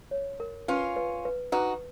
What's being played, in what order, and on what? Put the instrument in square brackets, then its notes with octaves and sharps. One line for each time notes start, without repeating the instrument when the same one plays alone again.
[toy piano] C#5
A#4
[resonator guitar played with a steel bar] C#4 F4 [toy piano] B4
[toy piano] B4
B4
[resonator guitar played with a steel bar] D#4 F#4 [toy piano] B4